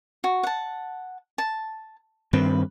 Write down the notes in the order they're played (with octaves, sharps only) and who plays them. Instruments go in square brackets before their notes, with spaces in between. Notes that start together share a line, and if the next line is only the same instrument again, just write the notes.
[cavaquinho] F#4
F#5 A5
A5
[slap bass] G2 D#3 C4 [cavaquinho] B4